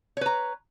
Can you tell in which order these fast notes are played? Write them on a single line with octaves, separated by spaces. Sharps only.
C#5 B4 A#5